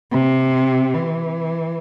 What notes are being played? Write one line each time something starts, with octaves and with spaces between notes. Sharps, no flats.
C3
E3